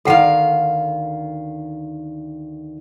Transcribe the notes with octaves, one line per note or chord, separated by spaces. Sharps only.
D2 D#3 A4 F5 F#5